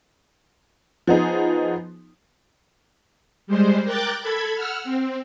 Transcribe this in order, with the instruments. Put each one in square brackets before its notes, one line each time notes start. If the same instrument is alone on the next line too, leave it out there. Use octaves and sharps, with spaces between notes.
[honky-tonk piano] F3 B3 D#4 G#4
[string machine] G3 G#3 C5
A#4 G5 D6 F#6 G6 A6
A4 B5 G#6
F#5 E6 F6
C4